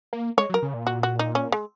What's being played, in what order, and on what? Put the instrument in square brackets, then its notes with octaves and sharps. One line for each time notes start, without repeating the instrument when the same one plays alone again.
[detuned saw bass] A#3
[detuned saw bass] G#3 [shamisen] C#5
[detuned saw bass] F#3
[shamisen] A#4
[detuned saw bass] C#3
A#2
[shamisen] F#4
F#4
D#4
C#4
G#3